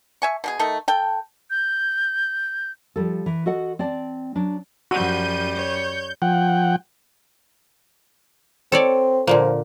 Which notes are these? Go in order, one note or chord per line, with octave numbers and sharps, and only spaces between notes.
E5 G#5 C#6
B2 D4 G#4
D#3 A3 A4 D#5
A4 G5
G6
F3 G3 A4
E3
F#4 A4 D#5 F#5
C4 D5 A5
F#3 D4
F#2 F3 G3 F#4 G6 D#7
C#5 G6
F3 F#5 G5
C4 A4 C#5 D5
A#2 D3 F3 A#3